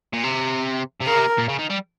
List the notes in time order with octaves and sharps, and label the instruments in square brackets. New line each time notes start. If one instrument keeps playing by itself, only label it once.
[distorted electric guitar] A#2
C3
C3
[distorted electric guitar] C#3 [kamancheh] A#4
[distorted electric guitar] C3
A#2
C#3
D#3
G3